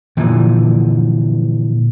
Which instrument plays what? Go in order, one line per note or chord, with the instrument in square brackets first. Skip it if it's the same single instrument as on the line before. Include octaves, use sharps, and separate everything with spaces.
[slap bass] A#2 D3 E3 F3